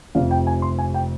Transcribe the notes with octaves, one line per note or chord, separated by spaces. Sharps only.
F1 F2 C3 F5
G5
G#5
C6
G#5
G5